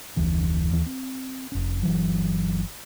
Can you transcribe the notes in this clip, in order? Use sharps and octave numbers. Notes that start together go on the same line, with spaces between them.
F1 D2 E3 D4
D#2 E3
C4
F1 C#4
G1 E3 F#3